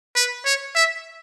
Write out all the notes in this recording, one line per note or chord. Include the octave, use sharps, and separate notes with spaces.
B4
C#5
E5